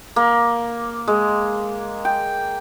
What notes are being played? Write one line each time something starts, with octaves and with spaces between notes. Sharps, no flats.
A#3
G#3
G5